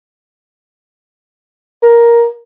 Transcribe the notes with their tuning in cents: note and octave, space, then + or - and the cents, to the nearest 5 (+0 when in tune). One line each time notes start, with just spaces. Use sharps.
A#4 +10